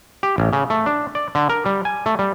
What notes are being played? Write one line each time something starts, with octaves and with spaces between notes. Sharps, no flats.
G4
A1
C#3
A3
D4
D5
D3
A#4
G3
G#5
A3
G3